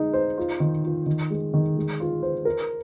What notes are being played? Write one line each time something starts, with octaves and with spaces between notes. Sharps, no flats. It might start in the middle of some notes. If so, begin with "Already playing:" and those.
Already playing: G#3 D#4
C5
F4
D#3
F4
D#3
G#3
D#3
G#3
F4
C5
A#4